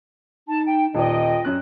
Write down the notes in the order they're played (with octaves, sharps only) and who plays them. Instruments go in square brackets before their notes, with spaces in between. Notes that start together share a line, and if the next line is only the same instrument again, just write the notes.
[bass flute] D#4 [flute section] A5
[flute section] G5
[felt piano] D#1 D5 [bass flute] F4 [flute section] D#5 G5
[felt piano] F#2 C#4 F#6